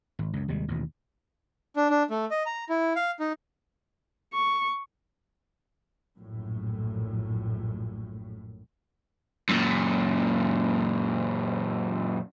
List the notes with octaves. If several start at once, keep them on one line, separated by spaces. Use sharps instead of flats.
G#1
C#2 F#2
D#2 C3 G3 G#3
A1 D#2 B2
D4
D4
A3
D#5
A#5
E4
F5
D#4
C#6
A#1 F#2 A2
F#2 A#2